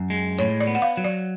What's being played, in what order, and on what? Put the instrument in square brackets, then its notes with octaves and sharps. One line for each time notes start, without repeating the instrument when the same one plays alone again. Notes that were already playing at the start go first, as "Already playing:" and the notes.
Already playing: [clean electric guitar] F#2
G#3
[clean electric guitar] A2 [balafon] C#5
[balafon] D5
[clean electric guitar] B3
[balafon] F#5
F5
[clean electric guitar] F#3
[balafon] D5